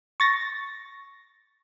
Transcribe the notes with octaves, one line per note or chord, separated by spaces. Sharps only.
C#6 A6 A#6